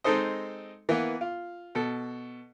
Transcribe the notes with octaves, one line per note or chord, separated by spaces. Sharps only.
G#3 C4 D#4 A4 C5 D#5
E3 A#3 B3
F4
B2 A4